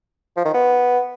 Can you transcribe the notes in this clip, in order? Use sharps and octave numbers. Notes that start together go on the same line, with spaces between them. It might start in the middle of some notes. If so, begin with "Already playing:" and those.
F3
D#3
B3